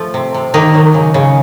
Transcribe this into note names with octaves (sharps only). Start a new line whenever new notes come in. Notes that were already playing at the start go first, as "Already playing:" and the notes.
Already playing: F3 A3
C3
C3
D#3 A#3 D#4
F#3
C#3
C#3